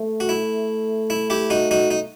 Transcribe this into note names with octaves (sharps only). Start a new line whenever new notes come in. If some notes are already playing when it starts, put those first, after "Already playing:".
Already playing: A3
F#4
E4
E4
E4 G4
D#4 F#4
D#4 F#4
D#4